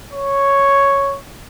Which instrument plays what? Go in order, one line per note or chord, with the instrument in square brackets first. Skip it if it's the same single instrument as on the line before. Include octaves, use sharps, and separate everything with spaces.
[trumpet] C#5